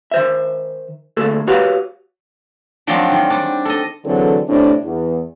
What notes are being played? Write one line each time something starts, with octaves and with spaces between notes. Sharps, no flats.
D#3 C5 E5
D2 A#3 G#4 A4
F#4 G4 B4 C#5 F5 F#5
D#3 F3 F#3 G#3 C4 D4
D#3
G3 D4
A4 D#5
D3 E3 F#3 C4 G#4 A4
A2 C3 C4 D4
E2